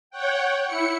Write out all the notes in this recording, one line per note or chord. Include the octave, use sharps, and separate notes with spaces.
C#5 F#5 G5
E4 C#7